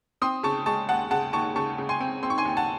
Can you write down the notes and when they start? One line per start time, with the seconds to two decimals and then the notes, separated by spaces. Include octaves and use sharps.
0.22 C4 C6 D#6
0.43 C#3 A5 C#6
0.66 G#3 A5 C#6
0.89 D#2 F#5 A5
1.11 C#3 F#5 A5
1.33 D#2 A5 C#6
1.56 C#3 A5 C#6
1.78 C#3
1.89 G#5 C6
2.01 C4
2.23 C4 C6
2.30 C#6
2.38 G#5 C6
2.45 D#2
2.57 F#5 A5